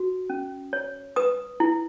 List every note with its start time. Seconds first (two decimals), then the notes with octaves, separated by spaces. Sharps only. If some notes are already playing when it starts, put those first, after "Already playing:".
Already playing: F#4
0.30 C#4
0.73 C#5
1.16 B4 D#6
1.60 E4